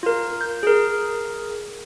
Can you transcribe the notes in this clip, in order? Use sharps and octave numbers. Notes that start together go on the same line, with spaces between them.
F4 A#4
G6
G#4 A#4